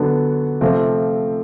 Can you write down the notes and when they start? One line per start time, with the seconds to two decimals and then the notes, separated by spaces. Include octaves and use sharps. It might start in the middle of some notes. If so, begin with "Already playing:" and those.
Already playing: D3 F#3 B3 D4
0.61 C3 F3 A3 C4 F4